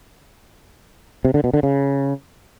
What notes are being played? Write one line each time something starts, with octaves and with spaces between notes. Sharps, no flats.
C3
D3
B2
D3
C#3